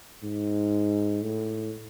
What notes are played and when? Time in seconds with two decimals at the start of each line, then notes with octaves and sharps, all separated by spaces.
0.24 G#2
1.23 A2